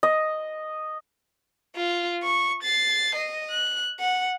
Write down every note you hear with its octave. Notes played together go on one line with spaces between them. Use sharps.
D#5
F4
C#6
A6 C7
D#5
F#6
F#5